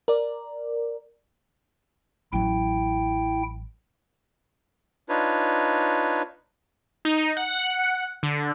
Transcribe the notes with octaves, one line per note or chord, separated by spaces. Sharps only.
A#4 D5
A1 F#3 E4 G5
D4 D#4 F4 B4 C#5
D#4
F#5
D3